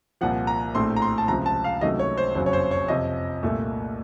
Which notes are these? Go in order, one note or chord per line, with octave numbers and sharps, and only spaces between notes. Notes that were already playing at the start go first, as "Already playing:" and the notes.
C2 A#2 F3 F#5
A#5
A#1 A2 A3 C4 C6
A#5
C6
A5
C#2 C3 F3 A#5
A5
F5
C#2 C3 D#3 F#3 A3 D#5
C#5
C5
F#1 F2 C#3 F#3 C5
C#5
C5
C#5
F2 C3 F3 D#5
C2 A#2 A3